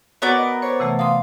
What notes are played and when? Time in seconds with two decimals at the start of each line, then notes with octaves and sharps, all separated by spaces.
0.22 B3 F#4 A#4 C#5 D5
0.38 D#5
0.62 C5 C#5
0.80 C3 E3 A3
0.99 F5 C6 D6 D#6